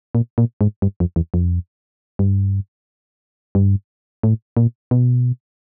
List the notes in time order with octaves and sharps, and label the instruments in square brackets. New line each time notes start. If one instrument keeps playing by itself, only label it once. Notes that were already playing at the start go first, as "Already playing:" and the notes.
[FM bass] A#2
A#2
G#2
G2
F2
E2
F2
G2
G2
A2
A#2
B2